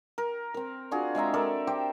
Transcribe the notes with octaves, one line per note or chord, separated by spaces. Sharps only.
A#4
C4 A#4
D4 F4 F#4 G#4
G#3 C4 E5 A#5
A4 A#4 D5
G4 C5 G5